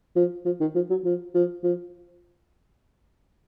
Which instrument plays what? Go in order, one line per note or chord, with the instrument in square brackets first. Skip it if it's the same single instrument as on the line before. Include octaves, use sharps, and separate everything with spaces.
[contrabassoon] F3
F3
D#3
F3
F#3
F3
F3
F3